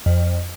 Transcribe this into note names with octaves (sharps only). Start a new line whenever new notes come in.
F2